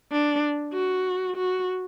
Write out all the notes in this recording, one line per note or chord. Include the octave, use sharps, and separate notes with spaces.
D4
F#4
F#4